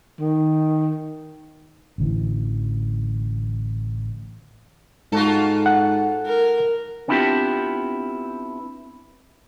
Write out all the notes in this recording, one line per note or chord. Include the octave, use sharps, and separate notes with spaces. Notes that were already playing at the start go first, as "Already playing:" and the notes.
D#3
A1 D3 E3
G#2 F4 F#4 A4
F#5
A#4
B3 C4 D4 E4 F4 G4